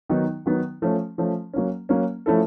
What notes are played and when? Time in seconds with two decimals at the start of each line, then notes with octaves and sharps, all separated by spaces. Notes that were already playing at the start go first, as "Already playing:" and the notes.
0.09 D#3 F#3 B3 D#4
0.46 D#3 F#3 B3 D#4
0.82 F3 A3 C#4
1.18 F3 A3 C#4
1.53 F#3 A#3 C#4
1.89 F#3 A#3 C#4
2.26 F3 A3 C#4 E4 A4